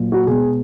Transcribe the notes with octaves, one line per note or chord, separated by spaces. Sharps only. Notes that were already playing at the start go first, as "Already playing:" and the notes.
Already playing: A#2 F#3
F#4
B2 G#3 G#4